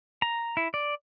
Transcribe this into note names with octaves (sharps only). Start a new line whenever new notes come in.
A#5
E4
D5